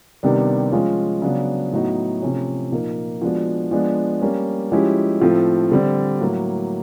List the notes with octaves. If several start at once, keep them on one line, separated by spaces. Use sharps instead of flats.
C3 D#3 G3 B3 D4
F3 G#3 C#4 F4
C#3 F#3 B3 D4
A2 F#3 B3 D#4 F#4
C3 F3 A3 C#4
A#2 F3 A#3 D#4
F3 G#3 B3 D4 F#4
F3 G#3 B3 D4
G3 A#3 C#4
F3 G#3 C#4 E4 G4
A2 F3 A3 C4
D3 G3 C4
A2 F#3 A#3